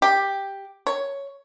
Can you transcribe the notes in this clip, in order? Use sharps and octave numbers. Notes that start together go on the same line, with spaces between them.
G4
C#5